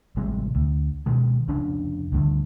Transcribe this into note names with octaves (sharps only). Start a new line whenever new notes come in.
A1 C3 G3 G#3
D2
B2 D#3 G#3
F1 C#3 D4
D2 G2 D3